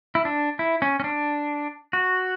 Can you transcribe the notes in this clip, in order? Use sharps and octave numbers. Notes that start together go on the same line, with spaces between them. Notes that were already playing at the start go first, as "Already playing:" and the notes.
E4
D4
E4
C#4
C#4
D4
F#4